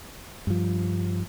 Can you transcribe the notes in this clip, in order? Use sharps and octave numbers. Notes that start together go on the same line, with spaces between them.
G2 F3